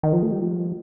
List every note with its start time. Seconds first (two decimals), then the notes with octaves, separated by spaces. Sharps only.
0.03 D#3
0.13 F3
0.23 A3
0.32 G3
0.42 F3